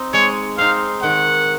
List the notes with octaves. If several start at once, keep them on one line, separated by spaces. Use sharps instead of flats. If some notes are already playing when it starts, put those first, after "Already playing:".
Already playing: C4 D#4
G#3 C#5
C4 D#4 F5
D#3 F#5